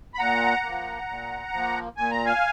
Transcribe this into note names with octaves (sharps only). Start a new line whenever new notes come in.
B5
A#2 F#5 A#5
F3 A#3
A#2
F3 A#3
A#2 G#5
A#5
F5 G#5